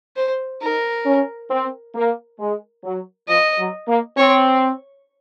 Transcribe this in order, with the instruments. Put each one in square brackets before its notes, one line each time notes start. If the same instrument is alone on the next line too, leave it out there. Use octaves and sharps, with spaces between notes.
[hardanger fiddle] C5
[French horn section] D#4 [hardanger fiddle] A#4
[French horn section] C#4
C4
A#3
G#3
F#3
[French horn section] F3 [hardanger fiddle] D#5
[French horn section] F#3
A#3
[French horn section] C4 [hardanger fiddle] C#5